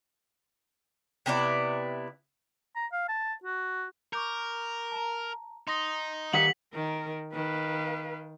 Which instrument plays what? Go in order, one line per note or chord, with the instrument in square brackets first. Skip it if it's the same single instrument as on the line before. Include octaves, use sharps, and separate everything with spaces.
[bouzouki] C3 B3 E4 D5
[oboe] A#5
F5
A5
F#4
[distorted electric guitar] A#4 [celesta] C#6 D6 G6
[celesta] A5 A#5
[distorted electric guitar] D#4 [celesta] C6 D#6 A#6
[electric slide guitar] D#3 G4 F#5 [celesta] F5 [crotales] B6 F#7
[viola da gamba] D#3 [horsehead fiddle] A#4
[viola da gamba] D#3 [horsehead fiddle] B4 F5